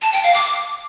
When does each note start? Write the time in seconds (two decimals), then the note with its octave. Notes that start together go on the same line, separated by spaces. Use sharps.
0.02 A5
0.13 G5
0.23 F5
0.34 D6